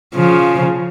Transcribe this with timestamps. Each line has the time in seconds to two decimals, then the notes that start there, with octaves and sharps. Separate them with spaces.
0.15 C#3 F3